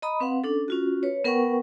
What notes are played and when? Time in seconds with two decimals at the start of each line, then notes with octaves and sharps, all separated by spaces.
0.02 D#5 A#5 B5 D#6
0.20 C4 B4 F5 F#5
0.44 C#4 D4 A4
0.68 C#4 F4 F#4
1.03 B4 C#5
1.24 B3 A#4 B4 F#5 G5 C#6